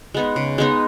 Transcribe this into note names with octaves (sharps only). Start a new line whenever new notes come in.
G#3 B3 D#4
C#3
G#3 B3 D#4